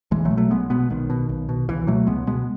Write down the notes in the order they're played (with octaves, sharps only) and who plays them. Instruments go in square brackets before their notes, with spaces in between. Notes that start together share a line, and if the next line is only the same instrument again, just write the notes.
[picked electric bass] B1 E3 G#3
F#3 A3
B2
F#3 A3
B1 G#3 B3
B2 G#3 B3
B1 D#3
B2
B1
B2
C#2 E3
B2 F#3 A3
C#2 G#3 B3
B2 G#3 B3